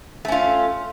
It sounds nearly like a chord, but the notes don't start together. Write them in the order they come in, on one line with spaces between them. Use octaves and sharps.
A3 C#4 F4